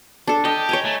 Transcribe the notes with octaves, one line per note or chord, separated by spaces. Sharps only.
D4 A4
G4 D#5
C#5 G#5 A#5
A3